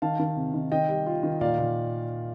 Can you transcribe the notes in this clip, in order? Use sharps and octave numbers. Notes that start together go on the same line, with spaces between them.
D#3 F5 A5
D#3
C3
D#3
D#3 D#5 G5
G3
F4
D#3
A#2 D5 F5
A#2